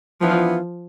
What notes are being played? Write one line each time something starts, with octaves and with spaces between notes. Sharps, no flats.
E3 F3 B3 D4 F4